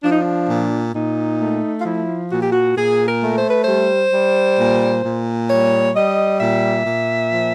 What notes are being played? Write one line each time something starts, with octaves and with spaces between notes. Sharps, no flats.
F3 D4
D#4
D4
A#2
A#2 D#4
A3
F4
F3 E4
A#2 F#4
G4
F#4
A#2 G#4
A#4
A3
C5
B4
C5
G3
G3
A#2
A#2
G3 C#5
G3 D#5
A#2 E5
A#2
F3